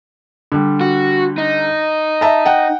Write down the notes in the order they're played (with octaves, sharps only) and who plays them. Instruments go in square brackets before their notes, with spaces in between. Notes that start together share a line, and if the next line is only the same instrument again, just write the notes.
[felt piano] D3 G3
[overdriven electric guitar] F#4
D#4
[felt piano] E5 A5 A#5
F#5 G5